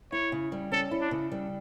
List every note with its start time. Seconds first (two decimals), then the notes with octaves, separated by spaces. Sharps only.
0.12 E4 C#5
0.32 C#3
0.52 G3
0.72 C#4 A4
0.91 E4
1.01 D4
1.11 C#3
1.32 G3